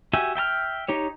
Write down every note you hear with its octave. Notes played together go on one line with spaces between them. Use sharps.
F#4 G4 E5 G#5
E5 G5 A5 F6
D#4 G4 C#5